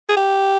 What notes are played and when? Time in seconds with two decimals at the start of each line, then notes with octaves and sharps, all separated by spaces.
0.09 G#4
0.17 G4